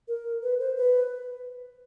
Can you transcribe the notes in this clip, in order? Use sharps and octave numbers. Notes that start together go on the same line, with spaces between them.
A#4
B4
C5
B4